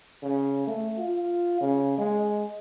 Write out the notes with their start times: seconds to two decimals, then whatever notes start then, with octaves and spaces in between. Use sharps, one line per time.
0.23 C#3
0.67 A3
0.98 F4
1.61 C#3
1.98 G#3